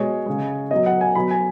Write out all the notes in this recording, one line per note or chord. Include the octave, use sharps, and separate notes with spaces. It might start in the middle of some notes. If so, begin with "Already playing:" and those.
Already playing: B2 G#3 C#5
C#3 G#3
B2 F#3 D#5
F#5
G#5
B2 F#3 B5
G#5